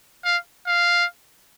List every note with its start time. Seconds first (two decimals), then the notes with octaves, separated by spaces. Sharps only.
0.25 F5
0.67 F5